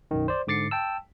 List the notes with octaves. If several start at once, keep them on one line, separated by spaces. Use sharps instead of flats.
B1 F#2 D#3
C5 D5
G#2 D3 D6 A6 C7 C#7
G5 A5 E6